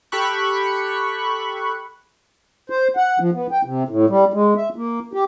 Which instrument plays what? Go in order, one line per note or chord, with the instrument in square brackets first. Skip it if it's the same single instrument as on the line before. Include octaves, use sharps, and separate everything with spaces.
[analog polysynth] G4 A4 B5 C#6 F#6
[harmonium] C5
F#5
F3
B3
G5
C3
A2
G3
G#3
E5
A#3
G4